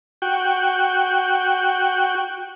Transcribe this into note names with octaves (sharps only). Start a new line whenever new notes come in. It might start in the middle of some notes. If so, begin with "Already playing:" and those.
F#4 G5